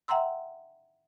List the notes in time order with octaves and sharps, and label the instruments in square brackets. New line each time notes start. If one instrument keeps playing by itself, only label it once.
[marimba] E5 F#5 G5 A#5 C6 E6